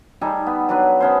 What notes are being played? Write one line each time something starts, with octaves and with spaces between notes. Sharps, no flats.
G3 D#4 G#4 A4
B3
F#3 D4 B4
B3 C#4 C5